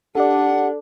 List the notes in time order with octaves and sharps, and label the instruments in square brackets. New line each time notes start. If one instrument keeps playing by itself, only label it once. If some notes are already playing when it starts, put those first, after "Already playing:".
[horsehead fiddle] D4 [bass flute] G4 [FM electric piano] A4 D5 [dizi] F#5